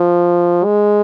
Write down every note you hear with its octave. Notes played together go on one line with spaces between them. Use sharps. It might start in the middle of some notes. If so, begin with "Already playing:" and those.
Already playing: F3
G#3